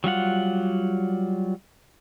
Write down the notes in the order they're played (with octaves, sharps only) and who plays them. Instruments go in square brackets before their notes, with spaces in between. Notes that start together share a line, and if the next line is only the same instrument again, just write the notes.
[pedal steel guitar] F#3 G3 F4 F#5